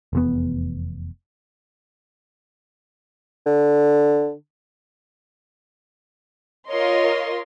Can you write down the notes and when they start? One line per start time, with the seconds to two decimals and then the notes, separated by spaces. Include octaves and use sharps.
0.13 F1 E2 B3
3.46 D3
6.69 F4 A#4 C#5 D#5 C6